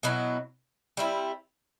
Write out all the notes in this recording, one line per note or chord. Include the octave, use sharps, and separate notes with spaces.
B2 F#3 B3 E4
G3 C4 E4